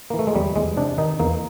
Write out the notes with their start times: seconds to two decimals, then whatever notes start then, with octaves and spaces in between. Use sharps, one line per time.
0.10 E3 A#3
0.19 A3
0.27 G#3
0.35 E2 G3
0.56 E2 G#3
0.77 C3 D4
0.98 D#3 D#4
1.20 E2 A#3